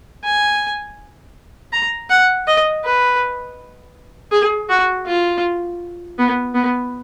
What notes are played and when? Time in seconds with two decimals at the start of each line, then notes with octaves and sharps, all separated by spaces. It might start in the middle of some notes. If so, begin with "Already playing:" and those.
0.24 G#5
1.73 A#5
2.10 F#5
2.48 D#5
2.84 B4
4.32 G#4
4.69 F#4
5.06 F4
6.19 B3
6.55 B3